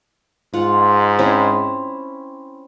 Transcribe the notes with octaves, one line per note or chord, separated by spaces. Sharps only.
G#2 F4 F5 F#5
C4 C#4 E4